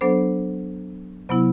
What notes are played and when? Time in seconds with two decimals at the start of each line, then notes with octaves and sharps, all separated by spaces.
0.01 F#3 B3 D4 A4 C5
1.29 C3 F#3 B3 E4